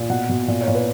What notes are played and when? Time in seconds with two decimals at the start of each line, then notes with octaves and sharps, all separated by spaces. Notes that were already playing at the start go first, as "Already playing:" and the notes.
Already playing: A#2
0.09 B2 F#5
0.29 B2
0.48 A#2
0.61 C#5
0.68 A#2
0.75 B4